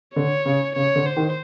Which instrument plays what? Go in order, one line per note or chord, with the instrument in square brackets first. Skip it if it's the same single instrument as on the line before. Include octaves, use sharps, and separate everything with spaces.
[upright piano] D3 [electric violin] C#5
[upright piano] C#3
[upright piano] C#3 [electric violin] C#5
[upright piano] D3
[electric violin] C5
[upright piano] D#3